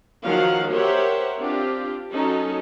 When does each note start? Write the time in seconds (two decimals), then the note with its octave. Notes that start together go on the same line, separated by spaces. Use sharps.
0.23 D#3 F3 F#3 F5 F#5
0.70 G4 A#4 C5 C#5 E5 F#5
1.40 C4 D4 F4 G4
2.13 F#3 C#4 D#4 A4